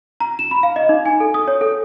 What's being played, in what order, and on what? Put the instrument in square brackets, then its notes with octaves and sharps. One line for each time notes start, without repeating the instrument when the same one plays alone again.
[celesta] A#5
E7
B5
F5
D#5
D#4
G#5
A4
D#6
C#5
A4